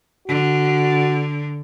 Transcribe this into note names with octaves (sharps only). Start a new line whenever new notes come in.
D3 F#4